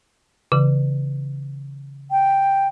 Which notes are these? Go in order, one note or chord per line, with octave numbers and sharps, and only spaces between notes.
C#3 E3
G5